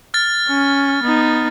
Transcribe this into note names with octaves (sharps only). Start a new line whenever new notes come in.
F6 A6
C#4
B3 D#4